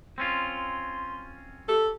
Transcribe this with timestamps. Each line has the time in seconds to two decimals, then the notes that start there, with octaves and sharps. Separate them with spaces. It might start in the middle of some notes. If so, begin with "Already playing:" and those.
0.18 C4 C#4 F4 C6
1.68 G4 A4